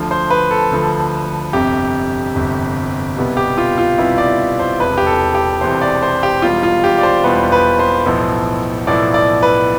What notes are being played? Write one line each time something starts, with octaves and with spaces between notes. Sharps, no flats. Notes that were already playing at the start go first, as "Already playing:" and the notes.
Already playing: D2 D3 F3
C5
B4
A4
D2 D3 F3
G1 F2 C3 G4
G1 F2 C3
C2 B2 G3 B3
G4
F4
F4
C2 B2 G3 B3 E4
D5
C5
E1 E2 C3 B4
G4
A4
G4
E1 E2 C3 C5
D5
C5
G4
E1 E2 B2 G3 F4
F4
G4
D5
C5
E1 E2 B2 G3 B4
B4
C5
B1 A2 F3 B3
B1 A2 F3 B3 D5
D5
B4